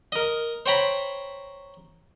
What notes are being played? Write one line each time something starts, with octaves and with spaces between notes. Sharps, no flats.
A#4 D#5
C5 C#5 G5 A#5 B5